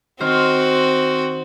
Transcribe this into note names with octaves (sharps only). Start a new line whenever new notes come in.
D#3 C4 F#4 C5 F6